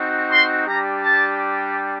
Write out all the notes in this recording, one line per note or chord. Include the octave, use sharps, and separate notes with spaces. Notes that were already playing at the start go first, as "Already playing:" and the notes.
Already playing: C4 D#4 F#4
C6
G3 D4 G4 A#5
A5